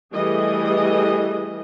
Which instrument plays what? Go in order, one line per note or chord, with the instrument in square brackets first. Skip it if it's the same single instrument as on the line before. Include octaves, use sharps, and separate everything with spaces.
[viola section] E3 G3 A3 G#4 D#5